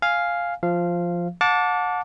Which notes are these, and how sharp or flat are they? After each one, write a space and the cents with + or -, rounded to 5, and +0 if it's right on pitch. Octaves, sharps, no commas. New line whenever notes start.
F5 +0 G#5 +0
F3 +0 F5 -15
F#5 -40 A5 +0 D6 -20